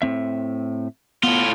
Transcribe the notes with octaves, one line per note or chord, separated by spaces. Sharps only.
A2 C4 E5
A2 B3 F4